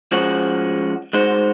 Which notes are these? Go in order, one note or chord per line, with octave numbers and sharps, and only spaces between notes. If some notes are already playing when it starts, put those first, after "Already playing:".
F3 G#3 C#4 F#4
G#3 D#4 F#4 C5